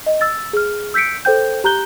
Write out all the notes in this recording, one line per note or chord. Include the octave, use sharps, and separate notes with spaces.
D#5
E6 A6
G#4 F6
E6 G6 B6 C#7 D7
A4 C5 G5 G6
G4 A#5 F#6 G6 G7